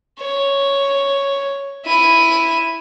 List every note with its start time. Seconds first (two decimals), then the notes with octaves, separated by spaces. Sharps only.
0.20 C#5
1.85 E4 D#7